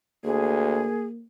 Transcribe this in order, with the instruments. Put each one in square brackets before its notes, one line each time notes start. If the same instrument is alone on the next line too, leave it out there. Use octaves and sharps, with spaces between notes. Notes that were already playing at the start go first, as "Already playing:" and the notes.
[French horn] D2 [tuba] A#3 [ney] G#4